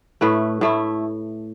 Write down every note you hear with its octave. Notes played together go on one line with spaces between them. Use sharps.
A2 A3 E4 B4
A2 A3 E4